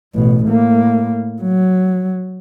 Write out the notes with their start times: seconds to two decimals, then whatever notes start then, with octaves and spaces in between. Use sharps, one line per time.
0.15 A1 B2
0.45 A2 A#3
1.42 F#3